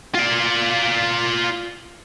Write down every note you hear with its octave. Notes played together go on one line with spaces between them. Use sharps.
F4 D5